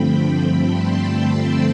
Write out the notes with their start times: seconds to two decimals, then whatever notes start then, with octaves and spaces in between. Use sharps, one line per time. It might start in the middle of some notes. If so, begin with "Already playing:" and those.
Already playing: G2 D3 F3 A3 C4 G5 B5
0.12 G5 B5
0.58 A5 C6
1.05 C6 E6